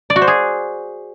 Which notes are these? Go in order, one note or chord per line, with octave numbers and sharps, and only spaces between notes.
D5
F#4
C5
G#4